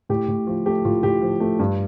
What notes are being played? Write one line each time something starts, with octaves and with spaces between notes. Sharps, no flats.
A2 G4
A2
F3 F4
A3 G4
A2 F4
A2 G4
F3
A3
G2